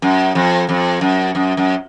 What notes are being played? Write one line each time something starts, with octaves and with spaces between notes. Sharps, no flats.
F#2
F2
F2
F#2
F#2
F#2